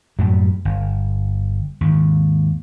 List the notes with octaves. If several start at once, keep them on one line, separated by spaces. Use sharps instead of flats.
F#2 A2 F#3 G3
G1
D#2 G#2